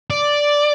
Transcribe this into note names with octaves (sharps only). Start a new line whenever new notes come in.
D5